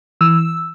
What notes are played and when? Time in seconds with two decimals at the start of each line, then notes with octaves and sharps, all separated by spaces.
0.21 E3 E6